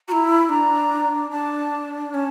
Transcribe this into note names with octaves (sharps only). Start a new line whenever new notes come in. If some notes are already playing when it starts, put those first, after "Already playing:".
E4 F#4 A#5
B5
D4 A#5
D4 A5
C#4 A5